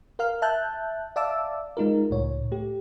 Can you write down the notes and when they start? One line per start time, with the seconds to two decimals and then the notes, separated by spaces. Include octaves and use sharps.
0.19 A#4 F5 F6
0.42 E5 A5 F#6 G6
1.16 D5 E5 F5 A5 D6 E6
1.77 G#3 D#4 F4 A#4
2.10 C#2 A2 C#5
2.52 A3 G4